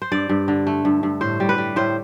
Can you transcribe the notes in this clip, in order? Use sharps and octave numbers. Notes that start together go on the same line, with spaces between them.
C5
G2 D5
G2
D3
A3
G2
G2
A2 C5
G3
B4
G3
A2 C5